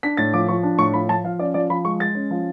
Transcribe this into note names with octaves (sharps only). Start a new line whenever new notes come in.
D4 B6
A2 A6
F3 D6
F3 C#6
D4
A2 C#6
F3 B5
F3 A5
F3 F5
C#4 D5
F3 D5
F3 B5
G#3 C#6
G#3 A6
C#4
F3